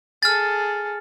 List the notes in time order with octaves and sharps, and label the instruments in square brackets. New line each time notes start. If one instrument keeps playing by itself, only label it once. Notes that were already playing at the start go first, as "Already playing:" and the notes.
[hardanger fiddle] G#4 A4 [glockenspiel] F6 A6